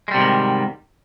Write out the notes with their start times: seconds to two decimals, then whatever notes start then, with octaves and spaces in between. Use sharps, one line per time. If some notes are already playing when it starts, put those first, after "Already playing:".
0.08 G#3
0.11 G3
0.14 C3
0.17 G#2
0.20 D#3